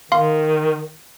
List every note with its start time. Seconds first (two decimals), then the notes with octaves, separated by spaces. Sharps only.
0.12 D#3 F5 C6